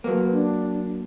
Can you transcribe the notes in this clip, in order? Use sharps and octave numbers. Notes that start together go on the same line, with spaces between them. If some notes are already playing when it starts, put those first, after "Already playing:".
F#3 A#3 B4
D4